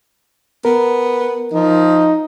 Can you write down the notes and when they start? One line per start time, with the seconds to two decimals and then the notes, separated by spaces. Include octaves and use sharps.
0.65 B3 A#4
1.53 F3 D#4